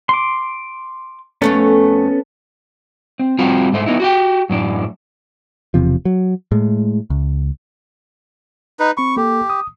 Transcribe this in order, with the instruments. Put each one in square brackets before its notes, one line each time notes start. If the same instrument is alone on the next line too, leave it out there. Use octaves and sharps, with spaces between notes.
[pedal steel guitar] C6 D6
[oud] F2 A3 C#5 [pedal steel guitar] B3 C#4 A4
[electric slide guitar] C4
G3 C4 F4 F#4
G#2 A3 C5
B3 D#4 E4
F#4 G4 G5
F#2 A2 D4
[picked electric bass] E1 E2 C3 F3
F#3
A2 G#3
C#2
[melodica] D#4 B4
[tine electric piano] C4 B5 [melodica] C#6
[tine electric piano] A#3 A4 [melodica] G4
[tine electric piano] D#6